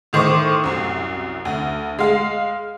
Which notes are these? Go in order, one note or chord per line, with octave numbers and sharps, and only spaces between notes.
A2 D#3 C5 C#6 D6
C2 F#2
D2
G#3 F5